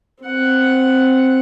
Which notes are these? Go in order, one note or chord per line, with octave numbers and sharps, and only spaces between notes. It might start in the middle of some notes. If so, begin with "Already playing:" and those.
C4 F#5